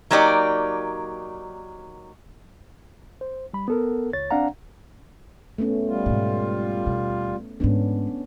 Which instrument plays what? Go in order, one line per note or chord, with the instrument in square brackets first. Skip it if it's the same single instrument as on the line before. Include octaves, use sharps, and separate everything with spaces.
[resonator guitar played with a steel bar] F#3 A#3 D#4 G4 A4 D5
[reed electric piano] C5
G3 B5
B3 A4 A#4
C#2 C#5 A6
C4 D4 D5 F5 F#5 A#5
[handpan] A3 B3 C#4
[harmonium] G3 F4
[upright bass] G#2 B2
D#2 B2
[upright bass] G#2 D#3 [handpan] B3 C#4 D4